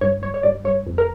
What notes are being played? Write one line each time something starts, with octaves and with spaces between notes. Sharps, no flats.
G2 C#5
G1 C#5
C#5
G2 D5
G2 C#5
F2
A#4